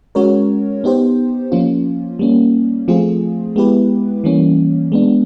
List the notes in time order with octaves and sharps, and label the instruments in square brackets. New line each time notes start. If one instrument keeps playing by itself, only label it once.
[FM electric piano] G#3 C#4 F#4 A#4 C#5
B3 D#4 G4 C5
F3 A#3 C#4 F4
G3 A#3 C#4
F3 A3 C4 F4 G#4
G#3 B3 E4 G4 B4
E3 G3 A#3 C#4
G#3 B3 D4